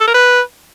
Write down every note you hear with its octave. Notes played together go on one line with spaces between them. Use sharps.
A4
A#4
B4